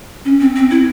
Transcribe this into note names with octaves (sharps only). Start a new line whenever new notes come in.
C#4
C4
C4
E4